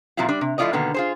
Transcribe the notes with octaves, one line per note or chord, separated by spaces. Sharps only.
A#2 F#3 G3 C4 E4 F4
G3 D4 D5
C3
F3 A3 E4 F4 D5 D#5
B2 D3 D#3 A#3 B3
F4 G#4 C5